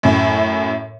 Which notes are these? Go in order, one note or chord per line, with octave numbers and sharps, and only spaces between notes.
F#2 A2